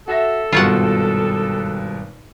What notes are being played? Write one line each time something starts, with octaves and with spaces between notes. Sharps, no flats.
F#4 A4 E5 A#6
G#1 G2 B2 F4 C#5 F#5